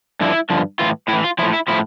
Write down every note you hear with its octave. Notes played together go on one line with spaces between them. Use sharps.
G2 D3 F3 E4
G2 D3 F3
A2 E3 F4
A2 E3 E4
F4
A2 F3 E4
E4
A2 F3 E4